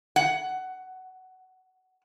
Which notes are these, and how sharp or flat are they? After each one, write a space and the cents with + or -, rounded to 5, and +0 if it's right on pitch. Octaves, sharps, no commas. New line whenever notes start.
F#5 +15